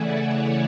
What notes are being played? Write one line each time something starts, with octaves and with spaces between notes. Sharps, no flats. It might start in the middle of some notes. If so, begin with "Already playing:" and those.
Already playing: C#3 E3 A3 D5 E5 F#5 G#5
C#5 E5